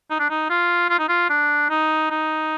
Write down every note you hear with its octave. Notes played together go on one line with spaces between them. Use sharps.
D#4
D4
D#4
F4
F4
D#4
F4
D4
D#4
D#4